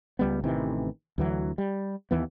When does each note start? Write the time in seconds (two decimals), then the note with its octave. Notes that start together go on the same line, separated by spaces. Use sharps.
0.19 C#2 G3 B3
0.44 A1 C3 D#3 E3
1.18 D2 E3 F#3
1.58 G3
2.11 D#2 E3 B3